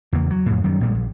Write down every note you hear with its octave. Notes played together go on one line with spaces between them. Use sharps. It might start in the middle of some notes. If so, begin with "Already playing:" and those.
E2 C#3 A#3
F#3
F2 A2
F#2 D#3 G3
A#1 A#2 G3 G#3
A#1